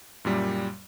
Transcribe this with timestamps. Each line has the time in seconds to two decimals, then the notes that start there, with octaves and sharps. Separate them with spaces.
0.25 F#2 A#2 G3